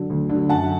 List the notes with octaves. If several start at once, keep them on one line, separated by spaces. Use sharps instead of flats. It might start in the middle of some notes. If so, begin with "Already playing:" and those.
Already playing: D3 F#3
D2
D3
F#3
F#2 F#5 A5